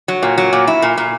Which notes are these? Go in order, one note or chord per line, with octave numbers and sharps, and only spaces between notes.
F#3
A#2
F#3
A#2
E4
A#2
A#2